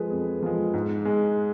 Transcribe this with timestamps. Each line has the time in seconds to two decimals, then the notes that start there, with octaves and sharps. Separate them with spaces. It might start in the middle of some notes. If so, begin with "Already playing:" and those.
Already playing: F3 G#3 G#4 A4 B4
0.10 F2 G#4
0.42 F3 G#3
0.74 G#2
1.05 G#3